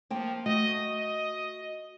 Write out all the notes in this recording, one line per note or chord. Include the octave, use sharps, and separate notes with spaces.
F3 A#3 G5 A5
A3 F#4 D#5
D#5